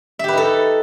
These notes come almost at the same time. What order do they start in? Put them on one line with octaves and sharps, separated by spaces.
E5 G4 B4 D#4 A4